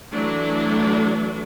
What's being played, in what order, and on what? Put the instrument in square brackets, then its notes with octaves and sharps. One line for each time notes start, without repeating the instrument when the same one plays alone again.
[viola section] E3 F#3 A3 D4